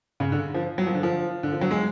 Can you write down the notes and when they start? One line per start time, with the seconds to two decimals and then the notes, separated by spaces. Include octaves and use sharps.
0.20 C#3
0.32 D3
0.54 F3
0.78 F#3
0.86 F3
0.95 D3
1.03 F3
1.43 D3
1.52 F3
1.61 F#3
1.71 G#3